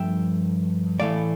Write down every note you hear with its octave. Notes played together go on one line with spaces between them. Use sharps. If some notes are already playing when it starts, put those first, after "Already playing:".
Already playing: G2 F3 A3 E5 G5
A2 E3 A3 D5 F5